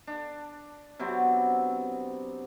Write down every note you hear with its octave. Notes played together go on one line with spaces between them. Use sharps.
D4
C3 F#3 B3 C4